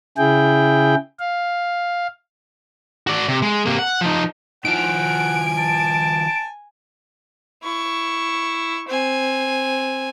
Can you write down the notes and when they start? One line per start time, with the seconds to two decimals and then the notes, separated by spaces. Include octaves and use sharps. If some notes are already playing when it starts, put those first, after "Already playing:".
0.18 C#3 E4 G#4 G5
1.20 F5
3.07 F#4 D5
3.28 C3
3.42 G#3
3.66 C3 A#3
3.79 F#5
4.01 F3 D#4
4.65 D#3 F3 F#5 G#5 D7
5.58 A5
7.63 E4 C#6
8.88 C4 G#5